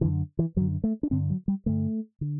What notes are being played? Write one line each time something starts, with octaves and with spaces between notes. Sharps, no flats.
F#2 D3 E3
E3
F#2 D3 F#3
A3
D4
G2 D3 C4
F#3
G3
G2 D3 A3
D3